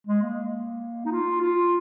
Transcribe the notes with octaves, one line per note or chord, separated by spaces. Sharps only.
G#3
A#3
D#4
F4
F4